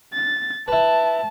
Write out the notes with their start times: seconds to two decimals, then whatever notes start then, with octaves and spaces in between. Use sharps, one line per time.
0.13 A6
0.68 E4 B4 A5